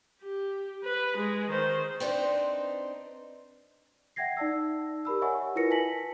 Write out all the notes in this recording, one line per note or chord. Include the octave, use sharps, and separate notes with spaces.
G4
B4
G#3
D#3 C5
C4 D4 D#4 B4 C5
E5 F#5 G5 G#6 A#6 C7
D#4 D5 A5 E6
G4 A#4 B5 E6
C#5 D#5 E5 F#5 G#5 C#6
E4 F4 A#4 B4 A#6 C#7
G#5 A5 A#6 B6 F#7